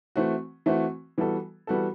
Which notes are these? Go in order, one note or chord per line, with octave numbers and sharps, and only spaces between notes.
E3 A3 C4 F#4
E3 A3 C4 F#4
E3 G3 B3 F#4 A4
E3 G3 B3 F#4 A4